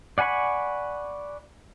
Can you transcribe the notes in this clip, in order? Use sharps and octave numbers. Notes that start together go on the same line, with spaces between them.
D5 F#5 G#5 B5 C#6